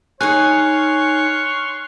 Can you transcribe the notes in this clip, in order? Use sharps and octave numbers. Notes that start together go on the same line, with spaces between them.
D#4 G#4 C#5 G#5 C6 C#6 F6 F#6